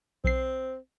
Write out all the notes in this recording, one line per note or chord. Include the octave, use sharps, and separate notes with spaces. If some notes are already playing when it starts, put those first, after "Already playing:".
B1 C4 C7